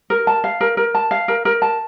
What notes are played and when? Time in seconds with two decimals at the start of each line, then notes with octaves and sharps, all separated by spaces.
0.10 A#4
0.27 A5
0.44 F5
0.61 A#4
0.77 A#4
0.95 A5
1.11 F5
1.28 A#4
1.45 A#4
1.62 A5